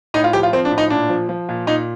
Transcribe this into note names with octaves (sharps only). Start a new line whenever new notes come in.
A2 D#4
F4
F3 G4
F4
F3 C4
D4
A2
D#4
A#2 D4
F3
F3
A#2
A#2 D#4